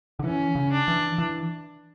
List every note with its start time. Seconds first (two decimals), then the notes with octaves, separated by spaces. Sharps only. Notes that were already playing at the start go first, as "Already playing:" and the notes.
0.19 D3
0.24 E3 C#4
0.55 C#3
0.72 D4
0.88 E3
1.18 E3